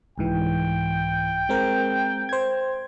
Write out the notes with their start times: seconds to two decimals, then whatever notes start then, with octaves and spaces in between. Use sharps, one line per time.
0.18 C2 G#2 E3 G5
1.49 G#3 C4 A#4
2.29 C5 G#6